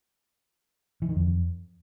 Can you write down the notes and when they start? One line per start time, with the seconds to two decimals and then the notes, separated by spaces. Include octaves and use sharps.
1.02 E3
1.09 D#3
1.16 F2